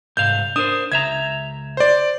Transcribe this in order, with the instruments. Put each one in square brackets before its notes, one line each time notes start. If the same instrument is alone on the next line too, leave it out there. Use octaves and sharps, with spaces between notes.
[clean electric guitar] C2 G#2 F5 [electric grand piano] G6
[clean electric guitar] D4 A#4 C5 [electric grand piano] D#6
[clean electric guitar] C#2 E5 A#5 [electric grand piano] G#6
[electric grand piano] C5 D5